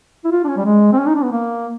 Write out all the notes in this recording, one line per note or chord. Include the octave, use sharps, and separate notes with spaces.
E4
F4
D4
C#4
G3
G#3
C4
C#4
D#4
D4
B3
A#3